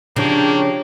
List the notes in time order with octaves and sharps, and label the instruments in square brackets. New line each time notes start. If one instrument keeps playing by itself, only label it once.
[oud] C#3 F3 [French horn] A#3 [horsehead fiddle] D4 [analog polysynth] G4 C#5 G5